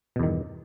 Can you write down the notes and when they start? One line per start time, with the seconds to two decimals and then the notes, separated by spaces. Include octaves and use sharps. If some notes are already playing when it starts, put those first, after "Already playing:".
0.16 B2
0.19 E2
0.23 D#3
0.27 G2